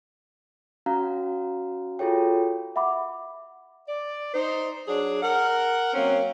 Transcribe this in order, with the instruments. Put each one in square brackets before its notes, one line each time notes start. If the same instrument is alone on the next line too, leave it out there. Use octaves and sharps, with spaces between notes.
[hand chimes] C#4 F#4 F5 A#5
F4 F#4 G#4 A4 C#5 G5
[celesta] E5 F#5 B5 D6
[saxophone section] D5
D#4 C5
F#3 D4 G#4
A#4 F#5
F#3 A#3 C4 C#4